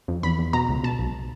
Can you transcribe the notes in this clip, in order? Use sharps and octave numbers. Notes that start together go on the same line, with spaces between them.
F2
E2 B5
E2
B2 A#5
C#2
B2 A5
B1